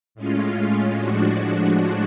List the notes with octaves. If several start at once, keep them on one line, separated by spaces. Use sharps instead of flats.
A2 G#3 C#4 F4
A2 F3 G#3 D4 F#4